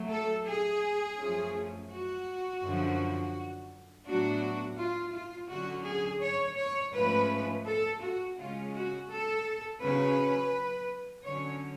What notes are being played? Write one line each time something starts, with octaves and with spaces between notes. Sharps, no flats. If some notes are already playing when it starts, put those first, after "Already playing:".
Already playing: F#3 A3
A4
G#4
F#2 F3 A3 C#4
F#4
F#2 D3 F3
A2 F#3 B3 D4 F#4
F4
F4
D3 F#3 C#4 F#4
G#4
C#5
C#5
G#2 F3 A3 C#4 B4
A4
F#4
C#3 G#3 C#4 F4
F#4
A4
C#3 F#3 C#4 B4
D3 F#3 C#4 C#5